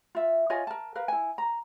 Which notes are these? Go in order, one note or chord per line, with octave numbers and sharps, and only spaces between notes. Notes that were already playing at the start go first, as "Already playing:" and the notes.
F4 E5
F4 C#5 D#5 G#5
A#4 A5
A#4 B4 F5
E4 G#5
A#5